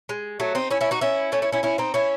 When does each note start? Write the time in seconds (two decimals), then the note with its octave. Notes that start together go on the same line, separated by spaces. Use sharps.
0.09 G#3
0.40 F#3 A3
0.55 C4 D#4
0.71 C#4 E4
0.81 C#4 E4
0.91 D#4 F#4
1.01 C#4 E4
1.32 A3 C#4
1.42 C#4 E4
1.52 C#4 E4
1.63 C#4 E4
1.78 C4 D#4
1.94 C#4 E4